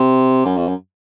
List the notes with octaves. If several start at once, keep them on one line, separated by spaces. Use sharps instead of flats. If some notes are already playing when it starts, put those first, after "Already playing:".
Already playing: C3
F#2
F2
F#2